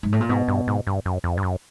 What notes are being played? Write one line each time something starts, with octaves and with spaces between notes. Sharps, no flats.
G#2
A2
A#2
G#2 B2
G2
G#2
G2
F#2
F2
G2
F#2